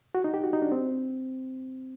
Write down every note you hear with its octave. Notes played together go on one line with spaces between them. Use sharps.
F#4
D#4
G4
F#4
D#4
D4
C4